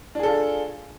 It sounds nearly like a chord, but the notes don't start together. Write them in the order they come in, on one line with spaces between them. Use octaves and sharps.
D4 G#4 A4 F4